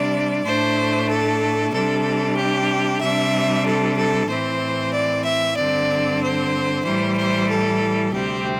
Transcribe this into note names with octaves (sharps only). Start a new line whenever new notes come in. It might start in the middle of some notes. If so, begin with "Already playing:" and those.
Already playing: C3 G3 D4 D5
A2 A3 D4 C5
A4
C3 G3 D4 A4
G4
C3 G3 D4 E5
A4
A4
A2 E3 C4 C5
D5
E5
G2 D3 C4 D5
C5
A2 E3 G3 C5
C5
A4
D2 C3 G3 C4 G4